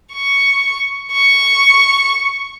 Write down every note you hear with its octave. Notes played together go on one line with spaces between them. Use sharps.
C#6
C#6